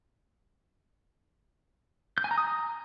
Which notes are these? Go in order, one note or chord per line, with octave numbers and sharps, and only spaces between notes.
G6
G#5
A#5
D#6
A#5